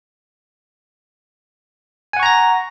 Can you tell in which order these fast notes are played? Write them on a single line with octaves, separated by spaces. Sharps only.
G#5 F#5 C#6 A#5 A#6